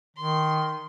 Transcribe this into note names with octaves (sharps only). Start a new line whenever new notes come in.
D#3 C6